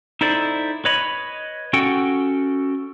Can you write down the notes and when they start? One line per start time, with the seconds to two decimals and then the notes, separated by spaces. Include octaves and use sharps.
0.21 D#4 E4 A4 C5 D5
0.85 B4 C#5 D#5 B5
1.73 C#4 F#4 A4 F#5 G5